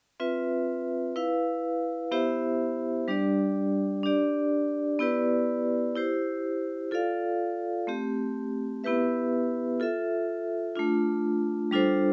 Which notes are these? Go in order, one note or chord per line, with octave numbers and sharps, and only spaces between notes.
C4 F4 B4 E5
E4 B4 F5
B3 E4 G4 C5 E5
G3 D4 G4 D5
D4 G4 D5
B3 E4 G4 B4 D5
E4 G4 C5
F4 A4 D5 F5
A3 C4 G4
B3 E4 G4 B4 E5
F4 A4 E5
A3 D4 F4
G3 D4 F4 A4 C5